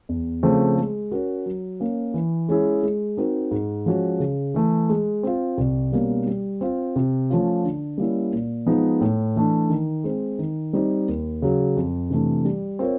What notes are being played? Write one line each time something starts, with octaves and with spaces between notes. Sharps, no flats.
E2
C#3 F3 A3 C4
G#3
C#4 F#4 A#4
F#3
A#3 C#4
E3
G#3 C#4 E4 G#4
G#3
C4 D#4 F#4 A#4
G#2
F3 G#3 C#4 F#4
C#3
E3 A3
G#3
C4 F4
C2
B2 G3 A#3 C#4
G3
C4 F4
C3
F3 A3 C#4 F4
D3
G3 A#3 C#4 E4
A#2
F3 G#3 B3 D#4
A2
E3 A3 D4
D#3
G#3 C4
D#3
G3 C4 D#4
D#2
C#3 F#3
F2
C3 E3 A3 D4
G3
C4 F4 A#4 C#5